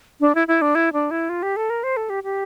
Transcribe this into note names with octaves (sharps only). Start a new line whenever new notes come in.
D4
E4
E4
D4
E4
D4
E4
F4
G4
A4
A#4
C5
A4
G4
G4